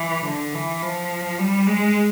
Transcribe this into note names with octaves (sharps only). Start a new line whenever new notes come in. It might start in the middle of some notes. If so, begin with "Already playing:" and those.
Already playing: E3
D3
E3
F3
G3
G#3